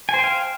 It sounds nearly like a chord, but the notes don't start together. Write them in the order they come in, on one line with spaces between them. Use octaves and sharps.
G#5 C5 G5 F5